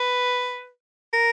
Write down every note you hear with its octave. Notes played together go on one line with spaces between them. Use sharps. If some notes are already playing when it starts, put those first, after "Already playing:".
Already playing: B4
A#4